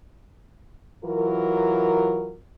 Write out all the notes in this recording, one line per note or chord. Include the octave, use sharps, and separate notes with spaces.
E3 F#3 F4 A#4